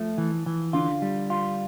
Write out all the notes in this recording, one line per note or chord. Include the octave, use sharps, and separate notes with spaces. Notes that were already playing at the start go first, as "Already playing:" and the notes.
Already playing: F3 A3
E3
E3
D3 F4
G3
F4